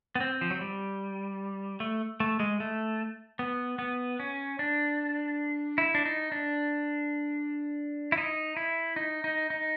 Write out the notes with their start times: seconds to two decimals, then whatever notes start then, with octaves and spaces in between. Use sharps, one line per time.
0.15 B3
0.20 C4
0.41 F3
0.51 F#3
0.61 G3
1.80 A3
2.20 A3
2.40 G#3
2.60 A3
3.39 B3
3.79 B3
4.20 C#4
4.59 D4
5.78 E4
5.95 D4
6.05 D#4
6.32 D4
8.12 E4
8.18 D#4
8.57 E4
8.96 D#4
9.24 D#4
9.50 D#4